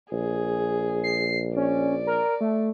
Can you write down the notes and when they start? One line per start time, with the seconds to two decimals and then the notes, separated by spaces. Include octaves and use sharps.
0.12 A#1 G#4
1.04 C7
1.56 C#4 D5
2.07 A#4
2.41 A3